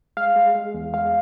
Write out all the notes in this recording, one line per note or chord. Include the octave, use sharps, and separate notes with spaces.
G#3 F5
G#3
G#3
E2
G#3 F5